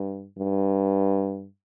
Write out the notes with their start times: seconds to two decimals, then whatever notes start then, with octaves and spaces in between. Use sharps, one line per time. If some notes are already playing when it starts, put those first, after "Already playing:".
Already playing: G2
0.39 G2